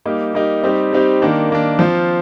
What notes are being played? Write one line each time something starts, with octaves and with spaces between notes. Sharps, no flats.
G3 A#3 D#4 G4
G3 A#3 D#4 G4
G3 C4 D#4 G4
G3 C4 D#4 G4
D#3 A#3 D4
D#3 A#3 D4
F3 C4 F4